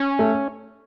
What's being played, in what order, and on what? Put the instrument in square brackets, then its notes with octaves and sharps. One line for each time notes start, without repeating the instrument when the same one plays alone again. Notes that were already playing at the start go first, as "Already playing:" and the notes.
Already playing: [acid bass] C#4
[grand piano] A3